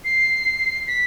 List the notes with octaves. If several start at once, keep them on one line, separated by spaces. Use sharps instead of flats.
C7
B6